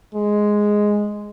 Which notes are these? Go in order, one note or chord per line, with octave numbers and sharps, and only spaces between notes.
G#3